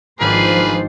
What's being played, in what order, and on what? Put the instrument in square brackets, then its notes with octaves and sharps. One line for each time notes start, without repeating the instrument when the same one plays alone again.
[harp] G#1 D4 [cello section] F3 C5 [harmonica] A#3 G#4 B4